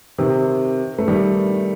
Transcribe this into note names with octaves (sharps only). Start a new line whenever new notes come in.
C3 D#3
A3
D#3 G3